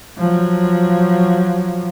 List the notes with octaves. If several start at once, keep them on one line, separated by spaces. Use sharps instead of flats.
F3 F#3